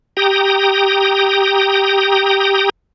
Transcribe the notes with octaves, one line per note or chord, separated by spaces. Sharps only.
G4 G5 A#5 D#6